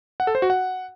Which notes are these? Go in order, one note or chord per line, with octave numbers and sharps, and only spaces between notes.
F#5
A4
C5
F#4
F#5